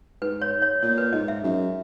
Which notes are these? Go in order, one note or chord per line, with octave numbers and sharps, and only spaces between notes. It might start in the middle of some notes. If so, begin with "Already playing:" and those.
G#2 B4
C#5
C#5
A#2 C#5
B4
G#2 D#5
E5
F#2